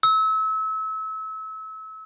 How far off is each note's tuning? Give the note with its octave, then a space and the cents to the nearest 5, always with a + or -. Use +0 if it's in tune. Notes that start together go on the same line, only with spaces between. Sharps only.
E6 -30